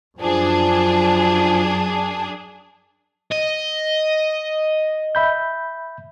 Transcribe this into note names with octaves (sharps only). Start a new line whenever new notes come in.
F#2 F3 D4 G#4
D#5
E5 B5 G6